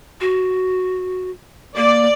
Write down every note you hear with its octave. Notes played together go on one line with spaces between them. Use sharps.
F#4
A#3 D5